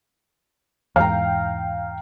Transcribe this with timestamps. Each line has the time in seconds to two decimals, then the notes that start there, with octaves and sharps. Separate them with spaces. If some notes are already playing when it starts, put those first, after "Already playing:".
0.96 E2 G#2 F5 G5 A#5